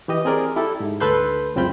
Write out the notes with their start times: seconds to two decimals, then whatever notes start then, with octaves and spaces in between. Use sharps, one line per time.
0.08 E3 G4 D#5
0.25 C4 G#4 A#4 D5
0.56 E4 G4 A4
0.80 G#2
1.00 D2 A4 B4 C6 G6
1.56 C#2 F#2 C4 F4 B5 G6